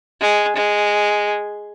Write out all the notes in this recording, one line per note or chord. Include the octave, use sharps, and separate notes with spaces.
G#3
G#3